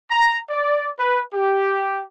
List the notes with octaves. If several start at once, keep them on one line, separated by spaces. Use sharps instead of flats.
A#5
D5
B4
G4